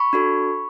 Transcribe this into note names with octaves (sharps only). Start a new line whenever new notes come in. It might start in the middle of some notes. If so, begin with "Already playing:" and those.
Already playing: B5 C#6
D4 F#4 A4